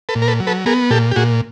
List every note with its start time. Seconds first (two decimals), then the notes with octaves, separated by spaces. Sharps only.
0.09 A4 B4
0.15 A#2
0.22 A#4
0.28 A4 B4
0.40 F#3
0.47 A4 B4
0.66 B3 G#4 A#4
0.90 A#2 G4 A4
1.11 G4
1.16 A#2 F#4 G#4